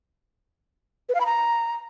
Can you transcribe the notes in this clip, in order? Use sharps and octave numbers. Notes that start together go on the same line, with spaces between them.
B4
F5
B5
A#5